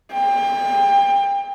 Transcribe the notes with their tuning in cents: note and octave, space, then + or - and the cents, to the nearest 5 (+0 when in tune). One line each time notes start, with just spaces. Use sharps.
G5 +30